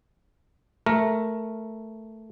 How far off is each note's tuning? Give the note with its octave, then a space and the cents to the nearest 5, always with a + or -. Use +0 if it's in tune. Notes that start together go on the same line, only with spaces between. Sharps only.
A3 +0 A#4 +5